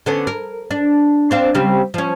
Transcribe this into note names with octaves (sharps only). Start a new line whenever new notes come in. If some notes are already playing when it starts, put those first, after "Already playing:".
D3 B3 C#4
A#4
D4
C4 D4 F5
C#3 G3 C4
F3 C#4